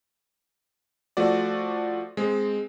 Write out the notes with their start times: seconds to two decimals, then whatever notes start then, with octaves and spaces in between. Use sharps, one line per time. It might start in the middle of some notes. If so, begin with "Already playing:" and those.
1.17 F3 A3 F#4 D5
2.17 G#3 C4